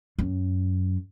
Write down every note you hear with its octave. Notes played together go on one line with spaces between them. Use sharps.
F#2